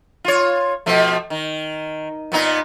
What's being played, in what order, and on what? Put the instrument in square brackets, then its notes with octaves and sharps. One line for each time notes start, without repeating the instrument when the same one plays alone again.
[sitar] F4 C#5
B2 F3 A3
D#3
A#2 B3 D#4